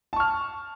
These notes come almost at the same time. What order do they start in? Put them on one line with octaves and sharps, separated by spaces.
A5 C#6 F6